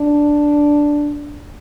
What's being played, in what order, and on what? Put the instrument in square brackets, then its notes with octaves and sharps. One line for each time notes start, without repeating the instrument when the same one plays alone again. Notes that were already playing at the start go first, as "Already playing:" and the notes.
Already playing: [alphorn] D4